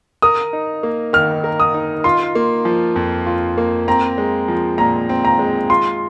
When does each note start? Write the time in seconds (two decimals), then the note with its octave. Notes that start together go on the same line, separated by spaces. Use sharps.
0.22 A#4 D#6
0.53 D#4
0.83 A#3
1.13 D#3 F6
1.44 A#4
1.60 D#6
1.74 D#4
2.04 F4 C6
2.35 A#3
2.65 F3
2.96 F2
3.26 F4
3.58 A#3
3.88 C4 A#5
4.18 G#3
4.48 F3
4.78 A#2 A#5
5.09 C4
5.25 A#5
5.39 G#3
5.70 F4 C6